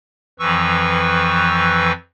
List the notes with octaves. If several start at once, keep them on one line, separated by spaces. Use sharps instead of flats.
F2 E3 F3 B4 C#6 E6